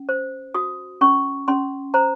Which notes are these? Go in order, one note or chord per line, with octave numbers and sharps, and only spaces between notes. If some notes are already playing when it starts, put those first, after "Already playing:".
Already playing: C#4
C5
F#4 D#6
C#4 C#6
C#4 C6
C5 A#5